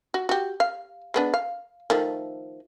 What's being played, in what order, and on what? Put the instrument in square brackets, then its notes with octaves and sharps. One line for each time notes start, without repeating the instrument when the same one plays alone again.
[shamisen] F#4
F#4 G4
F5
G#3 B3 D4
F5
D#3 F3 A3